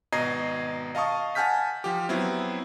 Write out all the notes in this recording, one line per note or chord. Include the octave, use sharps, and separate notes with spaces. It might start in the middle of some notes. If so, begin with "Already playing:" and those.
G#1 B2 D#5 A#5 G#6 C7
D#5 F5 A5 C#6 D#6
F#5 G#5 A5 F6 G6 B6
F3 G4
F#3 B3 C4 E4